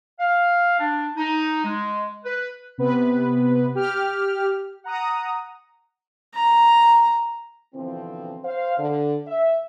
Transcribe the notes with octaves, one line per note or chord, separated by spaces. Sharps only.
F5
D4
D#4
G#3
B4
C3 B3 B4
G4 F6
F#5 A#5 D#6
A#5
B2 D3 E3 F3 C4
C5 F5
D3
E5